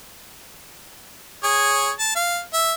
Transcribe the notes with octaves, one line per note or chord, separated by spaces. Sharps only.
G#4 C#5
A5
F5
E5